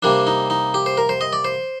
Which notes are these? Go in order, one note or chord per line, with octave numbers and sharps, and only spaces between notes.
C3 G3 A#3 D4
D#4
D#4
G4
C5
A#4
C5
D#5
D5
C5